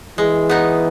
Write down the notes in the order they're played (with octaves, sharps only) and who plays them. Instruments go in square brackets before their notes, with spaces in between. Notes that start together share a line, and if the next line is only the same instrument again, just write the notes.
[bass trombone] E3 [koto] G#3
[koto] B3 D#4